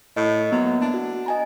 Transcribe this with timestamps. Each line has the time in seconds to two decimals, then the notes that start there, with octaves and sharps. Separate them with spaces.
0.17 A2 D#5
0.52 F#3 A#3 B3
0.81 D4
0.94 F#4
1.26 D#5 G#5 A#5